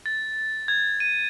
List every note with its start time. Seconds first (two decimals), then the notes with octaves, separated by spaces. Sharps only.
0.06 A6
0.68 G#6
1.00 D#7